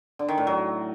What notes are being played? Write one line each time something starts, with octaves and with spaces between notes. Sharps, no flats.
D3
D#3
A2
F#3